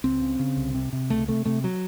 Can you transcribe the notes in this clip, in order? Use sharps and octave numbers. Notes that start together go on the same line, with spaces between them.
C#2 C4
C#3
C#3
C2
C3
C3
C#2 A3
C3 A3
C3 A3
F#3